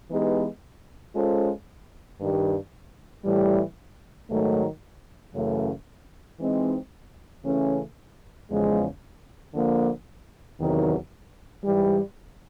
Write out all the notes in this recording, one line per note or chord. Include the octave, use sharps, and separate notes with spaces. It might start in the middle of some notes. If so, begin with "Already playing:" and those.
E3 G#3 B3 D#4 G4
G#3 C#4 F4 A4 C5
G2 D#3 G3
A2 E3 G3
G#2 D#3 F#3 A3
F#2 C#3 E3 A3
E3 G#3 C4 D#4
C#3 E3 A3 C#4
E2 C#3 F3 G#3
D3 F3 A#3
E2 C3 D#3 F#3
G#2 E3 G3